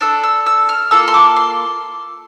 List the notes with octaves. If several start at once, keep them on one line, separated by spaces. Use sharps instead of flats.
D4 A4 E6
E6
E6
F6
A#3 F4 A4 E6
C6
D6
C6